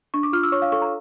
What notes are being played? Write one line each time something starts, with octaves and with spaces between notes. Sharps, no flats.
D4 C#6
D6
F4 F6
E6
C#5 C#6
F5
A4 C#6
A#5